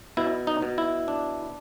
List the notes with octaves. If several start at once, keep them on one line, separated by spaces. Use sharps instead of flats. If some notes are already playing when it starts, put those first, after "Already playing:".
B2 E4
D#4
B2
E4
D4